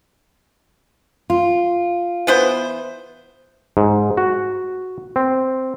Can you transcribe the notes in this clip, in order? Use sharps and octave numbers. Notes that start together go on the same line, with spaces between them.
F4
E3 B3 C5
G#2
F#4
C4